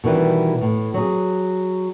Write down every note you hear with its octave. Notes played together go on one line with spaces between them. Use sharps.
B2 D#3 E3 G3
A2
F#3 G#4